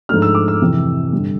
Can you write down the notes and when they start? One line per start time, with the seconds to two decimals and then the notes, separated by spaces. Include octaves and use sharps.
0.09 G#2 F3 A3 D4 F6
0.22 E6
0.35 D6
0.48 E6
0.61 F2 C3 E3
1.12 G2 D3 G3